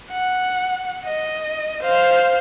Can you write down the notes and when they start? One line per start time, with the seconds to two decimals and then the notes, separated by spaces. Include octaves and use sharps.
0.11 F#5
1.05 D#5
1.82 C5 F5